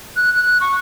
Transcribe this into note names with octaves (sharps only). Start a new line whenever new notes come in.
F#6
F#6
C#6